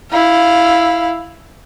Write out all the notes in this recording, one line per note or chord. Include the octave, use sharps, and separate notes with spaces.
E4 F5